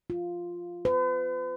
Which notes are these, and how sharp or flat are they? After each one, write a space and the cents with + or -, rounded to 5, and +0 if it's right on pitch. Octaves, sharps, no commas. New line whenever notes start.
F4 +0
B4 +45